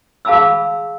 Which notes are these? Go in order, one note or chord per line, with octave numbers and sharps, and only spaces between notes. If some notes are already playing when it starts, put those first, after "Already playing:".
G#4 F5 A5 B5 D#6 E6